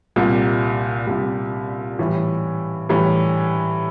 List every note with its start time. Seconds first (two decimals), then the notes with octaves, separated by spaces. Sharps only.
0.16 C2 A#2 G3
1.07 C2 A#2 G3
1.99 A2 E3 G3
2.89 A2 E3 G3